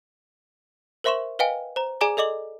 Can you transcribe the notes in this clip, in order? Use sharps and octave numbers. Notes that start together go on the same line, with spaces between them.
A#4 C5 E5 C6 C#6 E7
B4 D#5 F5 G5 G#5
C5 A#5
G#4 D5 G#5 A#5 D6 G7
A4 D5 D#5 D6 F#7